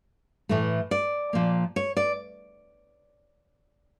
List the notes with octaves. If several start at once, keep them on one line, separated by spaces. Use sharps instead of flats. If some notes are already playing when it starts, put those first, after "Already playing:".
A2 E3 A3
D5
A#2 F3 A#3
C#5
D5